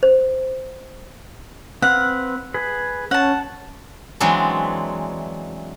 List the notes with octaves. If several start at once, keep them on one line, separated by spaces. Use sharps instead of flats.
C5
C4 B4 F5 F#5
G#4 B4
C#4 F#5 A5
E3 F#3 G#3 C4 D4